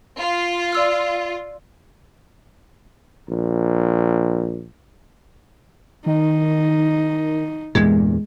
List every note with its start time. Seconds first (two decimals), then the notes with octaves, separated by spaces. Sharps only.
0.19 F4
0.72 D5 E6 F6
3.29 A#1
6.06 D#3 D#4
7.75 E2 G2 A#2 G#3